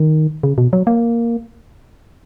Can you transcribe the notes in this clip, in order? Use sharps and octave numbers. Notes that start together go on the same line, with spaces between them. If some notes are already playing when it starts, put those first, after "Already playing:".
Already playing: D#3
C#3
B2
F#3
A#3